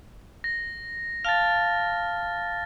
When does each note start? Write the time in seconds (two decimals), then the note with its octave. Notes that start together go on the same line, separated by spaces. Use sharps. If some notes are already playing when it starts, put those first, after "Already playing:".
0.44 A#6
1.25 F5 A5 F6 A6